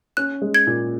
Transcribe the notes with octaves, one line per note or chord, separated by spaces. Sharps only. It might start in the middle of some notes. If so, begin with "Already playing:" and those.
C#4 F#6
G#3
G#6
A#2